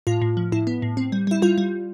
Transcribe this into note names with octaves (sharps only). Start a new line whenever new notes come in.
A2 F4
A2
F3
A2 E4
B3
A2
C4
G3
G3 E4
G3 F4
G3